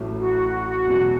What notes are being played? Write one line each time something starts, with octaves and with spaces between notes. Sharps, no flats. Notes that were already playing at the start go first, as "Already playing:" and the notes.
Already playing: A1 A2 F#3 A3
F#4
E1 E2 B2 F#3